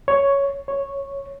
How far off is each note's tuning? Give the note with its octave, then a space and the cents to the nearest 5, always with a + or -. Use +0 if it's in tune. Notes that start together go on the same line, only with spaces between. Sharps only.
C#5 +5
C#5 -5